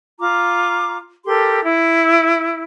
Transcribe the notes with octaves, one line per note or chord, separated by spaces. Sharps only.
F4 A#5 D6
G4 A4 A#4 C6
E4